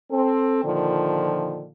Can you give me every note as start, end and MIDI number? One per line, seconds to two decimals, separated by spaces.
0.11 0.63 60
0.11 0.63 69
0.64 1.67 46
0.64 1.67 50
0.64 1.67 51
0.64 1.67 53